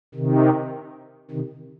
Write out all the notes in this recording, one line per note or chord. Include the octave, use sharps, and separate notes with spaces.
C3 D#3
C3 D#3